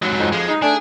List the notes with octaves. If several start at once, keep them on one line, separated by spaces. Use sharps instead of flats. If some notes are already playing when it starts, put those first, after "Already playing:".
G#2 F#3
F2 D#4
F2 F3 G#3
D#4
A3 D4 G#4